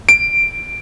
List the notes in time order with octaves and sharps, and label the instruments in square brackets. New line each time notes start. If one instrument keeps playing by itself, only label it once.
[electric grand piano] D7